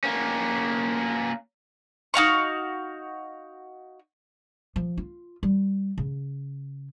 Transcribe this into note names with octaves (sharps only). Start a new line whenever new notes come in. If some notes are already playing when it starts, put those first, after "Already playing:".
A#3 C#4
D#4 F#4 F5 C#6
F3
F4
G3
C#3